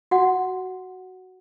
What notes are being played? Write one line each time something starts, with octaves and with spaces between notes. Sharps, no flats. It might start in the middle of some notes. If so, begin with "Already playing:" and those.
F#4 F#5